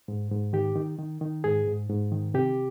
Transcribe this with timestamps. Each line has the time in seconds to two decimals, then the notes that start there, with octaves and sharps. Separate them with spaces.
0.08 G#2
0.31 G#2
0.53 D#3 G4
0.76 D#3
0.99 D#3
1.21 D#3
1.44 G#2 G#4
1.67 G#2
1.89 G#2
2.12 D#3
2.34 C3 G4